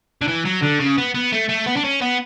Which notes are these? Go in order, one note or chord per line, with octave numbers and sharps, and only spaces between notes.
D3
E3
F#3
D3
C#3
B3
B3
A3
A3
B3
D4
C#4
B3